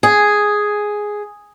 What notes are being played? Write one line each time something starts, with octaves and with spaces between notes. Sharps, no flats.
G#4